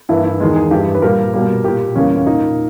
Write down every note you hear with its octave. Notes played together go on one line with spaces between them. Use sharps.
G2 E3 A#3 E4
E4
E2 D#3 G#3 G#4
G#4
G2 E3 G3 G4
B4
A#2 G3 A#3 A#4
B2 G3 A#3
A#2 A#3 G4
E2 C#3 G3 A#3 C#4
C#4
A#2 A#3 D#4